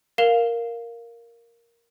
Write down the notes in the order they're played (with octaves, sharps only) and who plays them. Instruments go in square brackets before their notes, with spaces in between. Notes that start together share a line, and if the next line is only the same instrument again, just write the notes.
[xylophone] A#4 F5 E7 F7 G7